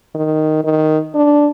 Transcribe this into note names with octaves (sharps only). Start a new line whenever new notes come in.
D#3
D#3
D4